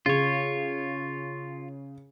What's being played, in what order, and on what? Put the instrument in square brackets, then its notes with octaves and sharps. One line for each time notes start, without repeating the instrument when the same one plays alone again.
[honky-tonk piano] C#3 [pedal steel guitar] F4 C#5